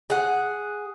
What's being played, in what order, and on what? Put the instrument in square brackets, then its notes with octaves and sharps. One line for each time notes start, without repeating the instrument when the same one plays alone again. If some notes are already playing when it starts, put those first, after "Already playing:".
[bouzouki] G#4 F#5